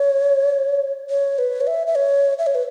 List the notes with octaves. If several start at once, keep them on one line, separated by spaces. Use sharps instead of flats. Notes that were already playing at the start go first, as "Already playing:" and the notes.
Already playing: C#5
C#5
B4
C#5
E5
E5
C#5
E5
C#5
B4